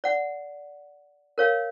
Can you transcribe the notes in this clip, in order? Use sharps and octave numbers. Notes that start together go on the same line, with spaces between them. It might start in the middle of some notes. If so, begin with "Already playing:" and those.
D5 F#5
A#4 C#5 F5